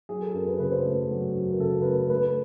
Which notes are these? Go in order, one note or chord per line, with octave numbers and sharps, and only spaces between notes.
F#3 G#4
A4
F#2 A#4
B4
C#3 B4
C5
A3 B4
F#3
F#2
A#4
C#3 A4
B4
A3 A#4
A3 B4